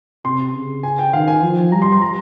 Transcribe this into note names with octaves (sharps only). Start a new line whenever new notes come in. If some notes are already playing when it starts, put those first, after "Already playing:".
C3 C6
C#3
G#5
G5
D#3 F5
G#5
F3
G3 A#5
C6
C6
A#5